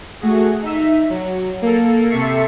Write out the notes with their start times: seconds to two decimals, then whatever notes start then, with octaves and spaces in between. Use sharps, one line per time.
0.21 A3 F#4 G#4
0.62 D#4 E5
1.10 F#3
1.62 A#3 A4
2.09 C3 A4 E5 C#6 C7